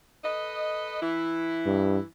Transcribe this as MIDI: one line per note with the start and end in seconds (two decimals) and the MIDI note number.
0.24 0.98 69
0.24 0.98 71
0.24 0.98 75
1.02 2.04 52
1.02 2.04 64
1.66 1.98 43